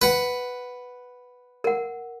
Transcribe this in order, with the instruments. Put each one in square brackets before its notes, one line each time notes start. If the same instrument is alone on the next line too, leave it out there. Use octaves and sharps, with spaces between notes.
[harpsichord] B4 F#5
[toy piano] A#4 F#5